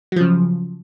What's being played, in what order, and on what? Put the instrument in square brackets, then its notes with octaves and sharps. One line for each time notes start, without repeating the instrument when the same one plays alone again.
[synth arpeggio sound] F#3
F3
C#3